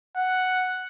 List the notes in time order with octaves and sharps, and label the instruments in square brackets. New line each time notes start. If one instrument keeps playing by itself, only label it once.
[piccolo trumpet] F#5